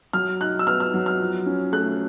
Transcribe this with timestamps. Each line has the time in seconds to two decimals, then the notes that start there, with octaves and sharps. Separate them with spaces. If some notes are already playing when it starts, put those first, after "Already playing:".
0.13 F#3 F6
0.41 D#4 F#6
0.59 E6
0.67 B3 F6
0.80 F6
0.94 F#3
1.06 F6
1.20 F3
1.46 C#4
1.72 A3 F#6